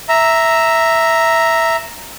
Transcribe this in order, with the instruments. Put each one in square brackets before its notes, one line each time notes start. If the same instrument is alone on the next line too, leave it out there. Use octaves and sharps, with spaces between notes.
[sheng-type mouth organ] E5 A#5